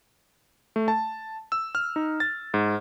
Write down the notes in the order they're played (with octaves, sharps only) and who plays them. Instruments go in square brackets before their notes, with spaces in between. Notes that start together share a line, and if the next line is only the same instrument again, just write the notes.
[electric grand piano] A3
A5
E6
F6
D#4
A6
G#2